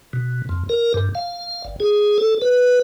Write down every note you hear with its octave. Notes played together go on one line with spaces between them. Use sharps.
B2
F2
A#4
G2
F5
G1
G#4
A4
B4